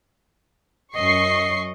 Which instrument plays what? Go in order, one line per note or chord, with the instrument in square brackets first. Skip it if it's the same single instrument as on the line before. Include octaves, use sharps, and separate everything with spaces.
[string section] F#2 C#6 C7 [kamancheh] D#5